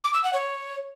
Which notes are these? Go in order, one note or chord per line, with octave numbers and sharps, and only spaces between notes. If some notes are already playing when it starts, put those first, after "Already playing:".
D6
E6
F#5
C#5